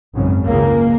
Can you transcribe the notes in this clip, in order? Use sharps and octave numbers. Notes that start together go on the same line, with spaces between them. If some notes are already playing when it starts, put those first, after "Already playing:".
G#1 F#2 C#3
C#2 C#3 A#3